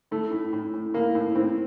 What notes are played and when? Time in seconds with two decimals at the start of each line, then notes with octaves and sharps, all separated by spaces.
0.11 A2 A3
0.31 A2
0.53 A2
0.74 A2
0.94 A2 A#3
1.15 A2
1.35 A2 C4